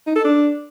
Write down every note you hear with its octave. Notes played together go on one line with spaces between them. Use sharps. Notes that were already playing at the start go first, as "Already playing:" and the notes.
D#4
A4
D4